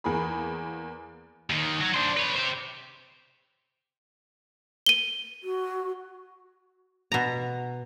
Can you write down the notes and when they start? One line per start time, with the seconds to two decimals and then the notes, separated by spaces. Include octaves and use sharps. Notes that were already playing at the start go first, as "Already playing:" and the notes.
0.04 E2 A#3 G#4 B5
1.50 D#2 D#3
1.81 F#3
1.94 D4 C5
2.17 B4 C#5
2.37 G4 C5
4.86 D#7 G7
5.43 F#4
7.12 B2 A#5